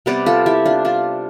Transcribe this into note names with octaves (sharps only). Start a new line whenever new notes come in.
C3 G3 B3 B4 D5
F4 A4
E4 G4
D4 F4
D4 F4